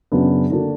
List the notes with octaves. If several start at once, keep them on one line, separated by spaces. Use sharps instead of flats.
F#2 C#3 F#3 B3 D4
D3 A#3 D4 F#4